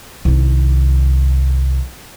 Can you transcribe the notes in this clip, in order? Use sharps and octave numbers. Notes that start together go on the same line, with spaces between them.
C2 D#3